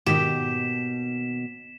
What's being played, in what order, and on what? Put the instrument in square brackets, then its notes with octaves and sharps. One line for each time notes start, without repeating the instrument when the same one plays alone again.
[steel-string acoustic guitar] D#2 B2 [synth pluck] G#2 D#3 [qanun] G4 [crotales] B6 E7